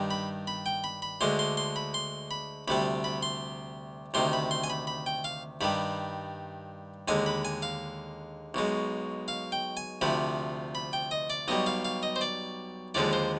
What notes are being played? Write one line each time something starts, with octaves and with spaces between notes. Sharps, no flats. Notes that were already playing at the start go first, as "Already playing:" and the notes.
Already playing: G2 D#3 G3
B5
B5
G5
B5
B5
D2 D3 G#3 C6
C6
C6
B5
C6
B5
D2 C3 G3 B5
B5
C6
D2 C3 D#3 C6
B5
C6
G#5
B5
B5
G5
F5
G2 D#3 G3 B5
D#2 D3 G#3 G#5
B5
G#5
F5
B1 B2 G#3
F5
G5
G#5
D2 C3 F3 B5
B5
G5
D#5
D5
B1 B2 G3 D#5
F5
F5
D#5
C5
D5
D#2 D3 F3 G#3 D5
C5